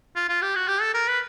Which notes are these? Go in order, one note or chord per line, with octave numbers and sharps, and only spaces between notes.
F4
F4
G4
F#4
G4
A4
A#4
B4